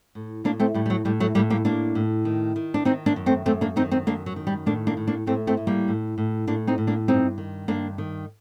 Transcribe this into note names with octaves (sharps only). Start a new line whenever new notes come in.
A2
A2 A#3 D4
A3 C4
A2 G3
G3
F#3
A2 G3
F#3 A3
A2 G3 A#3
G3 A#3
A2 A#3 D4
A2
D#3
D#3
D4
D#3 C4 D#4
A#3 D4
F#2
A3 C4
F#2 A3 C4
A#3 D4
D#3 C4 D#4
C4 D#4
F#2 A#3 D4
F#3
D#3
G3
A2 A#3 D4
A#3 D4
A2
A#3 D4
A2 A3 C4
A3 C4
A2
G3 A#3
A2
A2
A2 A#3 D4
C4 D#4
A2
A#3 D4
G2 C4 D#4
D#3
G2 A#3 D4
D#3